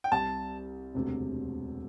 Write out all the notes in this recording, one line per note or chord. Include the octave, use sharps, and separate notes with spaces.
G5
C2 C3 G3 C4 A5
E1 D2 C3